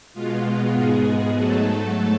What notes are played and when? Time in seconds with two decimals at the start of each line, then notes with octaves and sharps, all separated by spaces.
0.14 B2 G#3 B3 F4
0.75 G#2 G#3 B3 G#4
1.35 G#2 F#3 A3 A4